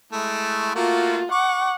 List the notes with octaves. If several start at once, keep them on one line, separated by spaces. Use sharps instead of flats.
G#3 A3 E4
A3 A#3 F4 F#4
F#5 C#6 D6